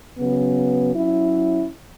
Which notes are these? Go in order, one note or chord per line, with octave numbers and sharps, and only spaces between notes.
C#3 F#3 B3
F#3 C#4 E4